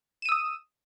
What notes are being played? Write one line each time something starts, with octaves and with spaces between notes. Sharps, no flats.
D#6 E6 D#7 E7